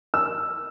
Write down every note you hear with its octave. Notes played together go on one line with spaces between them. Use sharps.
E6